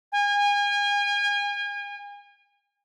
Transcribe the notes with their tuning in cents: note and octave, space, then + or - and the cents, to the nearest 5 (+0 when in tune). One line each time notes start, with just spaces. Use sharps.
G#5 -35